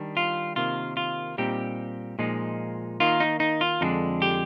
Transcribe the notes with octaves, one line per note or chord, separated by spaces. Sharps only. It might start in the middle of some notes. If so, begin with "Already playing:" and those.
Already playing: D#3 G3 D4
F4
C3 D#3 A#3 F4
F4
A#2 G3 C4 D#4 G4
A#2 F3 G#3 D#4
D#3 A#3 D#4 F4
D#4
D#4
F4
F2 D3 G#3 D4 D#4
G4